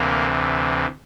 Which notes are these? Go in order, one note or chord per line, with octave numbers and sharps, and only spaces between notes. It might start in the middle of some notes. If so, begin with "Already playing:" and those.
Already playing: D2 C3 E3 A#3